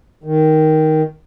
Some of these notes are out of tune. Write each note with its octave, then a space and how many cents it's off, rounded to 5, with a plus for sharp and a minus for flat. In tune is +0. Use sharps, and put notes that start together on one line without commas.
D#3 +5